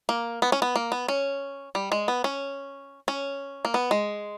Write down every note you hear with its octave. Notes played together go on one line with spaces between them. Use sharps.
A#3
B3
C#4
B3
A#3
B3
C#4
G3
G#3
B3
C#4
C#4
A#3
B3
G#3